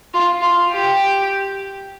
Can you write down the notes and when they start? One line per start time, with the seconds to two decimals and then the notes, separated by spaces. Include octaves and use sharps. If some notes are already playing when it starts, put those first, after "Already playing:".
0.14 F4
0.42 F4
0.72 G4